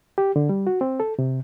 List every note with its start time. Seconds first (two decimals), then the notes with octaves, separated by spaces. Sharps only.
0.18 G4
0.36 D3
0.49 G3
0.67 F#4
0.81 C4
1.00 A4
1.19 C3